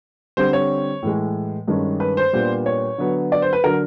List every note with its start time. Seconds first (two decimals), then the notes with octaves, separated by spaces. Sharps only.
0.37 D3 G3 C4 C5
0.53 C#5
1.02 A2 E3 G#3
1.68 G2 D#3 G#3 C#4
2.00 B4
2.17 C5
2.33 A#2 G3 B3 D4
2.66 C#5
2.98 D3 F#3 B3
3.32 D5
3.42 C5
3.53 B4
3.64 D3 F#3 A#4